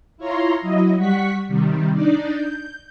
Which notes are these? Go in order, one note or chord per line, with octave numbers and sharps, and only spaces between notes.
E4 F4 C#5 A#5 C6
F#3 E4 D#5
G3 F#5 C#6 B6
C3 D#3 G3
D4 D#4 D5
G6